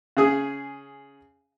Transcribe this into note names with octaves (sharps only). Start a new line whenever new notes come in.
C#3 G#4 D#6